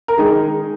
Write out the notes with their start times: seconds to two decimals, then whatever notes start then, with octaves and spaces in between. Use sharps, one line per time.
0.08 A#4
0.18 D#3 G#3 D#4 G#4